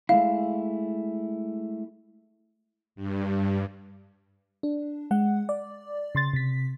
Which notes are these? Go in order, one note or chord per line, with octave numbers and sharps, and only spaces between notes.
G#3 A3 E4 F5
G2
D4
G#3 F#5
D5
C#3 C6 A6
C3 B6